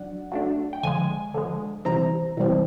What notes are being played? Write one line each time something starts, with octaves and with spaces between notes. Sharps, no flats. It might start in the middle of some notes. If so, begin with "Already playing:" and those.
Already playing: F#3 D4 F#5
F#3 A3 D4
G5
D3 F3 G#3 G#5
D3 F3 G#3
C3 E3 G3 C4 A#5
C3 E3 G3 C4